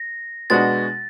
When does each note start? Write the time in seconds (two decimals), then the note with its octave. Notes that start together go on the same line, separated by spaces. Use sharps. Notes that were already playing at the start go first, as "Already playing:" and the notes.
Already playing: A#6
0.50 B2 G#3 B3 D4 F#4 A6